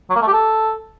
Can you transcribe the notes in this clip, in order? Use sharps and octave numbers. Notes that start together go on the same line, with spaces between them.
F#3
A#3
A3
G4
A4